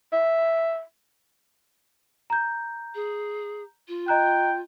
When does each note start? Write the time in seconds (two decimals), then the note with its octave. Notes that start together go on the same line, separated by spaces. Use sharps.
0.13 E5
2.30 A#5 G6
2.95 G#4
3.88 F4
4.08 D#5 G5 A#5 F#6